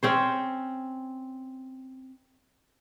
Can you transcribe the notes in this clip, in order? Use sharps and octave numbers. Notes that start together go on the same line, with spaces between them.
C4 C#4 C5